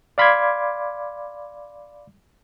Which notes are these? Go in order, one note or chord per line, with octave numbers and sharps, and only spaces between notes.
D5 F5 B5 C6 D6 G#6